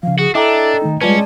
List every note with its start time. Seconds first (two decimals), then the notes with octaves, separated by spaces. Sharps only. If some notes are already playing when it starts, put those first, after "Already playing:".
0.03 C#3 F3 F5
0.19 F#4 G#4
0.35 D4 E4 A4 D#5 E5 G5 A#5 D6
0.82 D#3 A3 D#4
1.01 G3 G#3 C#4 F4 B4 D5 A5